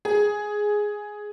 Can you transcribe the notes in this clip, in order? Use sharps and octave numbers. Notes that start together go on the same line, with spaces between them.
G#4